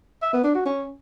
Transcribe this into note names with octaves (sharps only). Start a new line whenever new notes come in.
E5
B3
D4
F#4
C#4